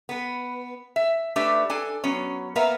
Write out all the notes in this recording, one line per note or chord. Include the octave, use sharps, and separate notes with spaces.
B3 B4
E5
A3 D4 G4 B4 D5 E5
D4 A4 G#5
F#3 B3 C#4
A#3 B3 A#4 B4 E5 F5